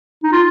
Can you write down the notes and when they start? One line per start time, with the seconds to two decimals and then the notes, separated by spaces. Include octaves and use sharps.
0.23 D#4
0.32 F4